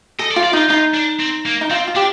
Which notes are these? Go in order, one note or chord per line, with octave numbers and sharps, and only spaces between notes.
A4 D#5
D5
F4
D5
D#4 F4
D#4 F4
D4
C4
A#3
D#4
C4 F4
F4
D4 G4